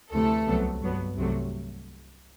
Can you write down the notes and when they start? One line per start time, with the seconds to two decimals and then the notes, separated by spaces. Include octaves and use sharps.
0.11 D2 C3 E3 A3 A4
0.47 C2 C3 F#3 B3
0.81 G2 F#3 B3
1.17 C2 C3 F#3 A3